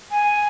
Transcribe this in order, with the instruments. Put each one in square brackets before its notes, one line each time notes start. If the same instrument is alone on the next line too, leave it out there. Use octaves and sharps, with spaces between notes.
[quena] G#5